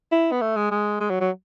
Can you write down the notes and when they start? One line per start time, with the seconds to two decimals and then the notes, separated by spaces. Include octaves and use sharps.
0.12 E4
0.32 B3
0.41 A3
0.56 G#3
0.71 G#3
1.01 G#3
1.10 F#3
1.21 F#3